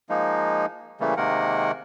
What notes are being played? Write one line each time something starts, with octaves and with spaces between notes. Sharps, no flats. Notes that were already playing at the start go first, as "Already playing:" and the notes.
F3 G#3 A#3 D#4
C#3 E3 G3 A3 A#3
C3 D#3 G#3 A#3 A#4 F#5